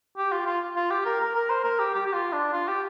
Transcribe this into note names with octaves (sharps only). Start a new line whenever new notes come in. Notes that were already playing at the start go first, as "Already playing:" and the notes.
G4
F4
F4
F4
G4
A#4
A#4
A#4
C5
A#4
G4
G4
G4
F4
D4
F4
G4